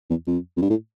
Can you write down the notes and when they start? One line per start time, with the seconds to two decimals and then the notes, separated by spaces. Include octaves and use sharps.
0.10 E2
0.27 F2
0.57 F2
0.62 G2
0.70 A2